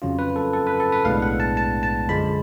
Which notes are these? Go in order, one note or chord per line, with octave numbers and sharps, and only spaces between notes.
F2 C#3 F#3 C#4 F4
B4
A4
A4
B4
A4
B4
B1 A2 G#3 B3 D4 F5
F#5
A5
A5
A5
F#2 D3 F3 G#3 B5